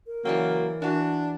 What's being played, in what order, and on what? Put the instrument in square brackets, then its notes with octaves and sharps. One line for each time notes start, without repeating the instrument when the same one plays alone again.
[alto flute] A#4
[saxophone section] C#3 F#3 A#3 [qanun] E3 D5 G5
[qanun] E3 F#4 [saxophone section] D4